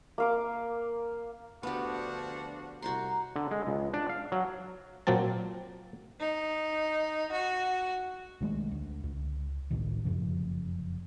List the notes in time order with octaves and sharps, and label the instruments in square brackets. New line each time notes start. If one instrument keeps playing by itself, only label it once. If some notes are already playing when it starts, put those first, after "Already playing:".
[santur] A#3 F5 D6
[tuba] D2 [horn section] F3 D4 F#4 [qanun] B3 G4
[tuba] C2 [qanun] F#4 C5 C6 [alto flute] A#5
[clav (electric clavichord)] D3
G#3
C#2
D4
F5
F#3
A#2 F#3 A#3 C4 A5
[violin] D#4
F#4
[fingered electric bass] B1 D#3 G#3 A3
D2
C#2
G#1 C#2 A2 D#3
F1 F#2 C#3 F3